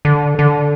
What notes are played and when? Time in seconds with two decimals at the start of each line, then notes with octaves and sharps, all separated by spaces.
0.05 D3
0.39 D3